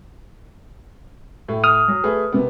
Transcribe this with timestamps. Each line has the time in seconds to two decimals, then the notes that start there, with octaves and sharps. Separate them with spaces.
1.48 A2
1.64 D#6 F6
1.88 F#3
2.04 A3 G#4 B4
2.32 C3 A#3 B3